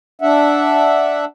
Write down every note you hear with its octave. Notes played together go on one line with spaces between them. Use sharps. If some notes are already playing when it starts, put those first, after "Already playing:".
D4 E5 F#5